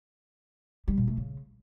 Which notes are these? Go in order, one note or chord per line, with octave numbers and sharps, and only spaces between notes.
G3
A#2
A3
C#3